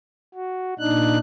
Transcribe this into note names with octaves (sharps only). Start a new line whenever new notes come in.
F#4
A#2 D4 D#4 F#6